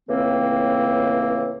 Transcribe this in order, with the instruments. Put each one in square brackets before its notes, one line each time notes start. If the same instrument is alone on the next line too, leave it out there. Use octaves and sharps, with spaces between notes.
[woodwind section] C#2 A2 E3 A#3 C4